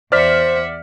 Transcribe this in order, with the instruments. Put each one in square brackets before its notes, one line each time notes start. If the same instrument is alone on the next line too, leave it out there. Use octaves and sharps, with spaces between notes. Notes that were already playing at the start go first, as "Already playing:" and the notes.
[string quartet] E2 E5 F#5 [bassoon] C5 [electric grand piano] D5 F6 B6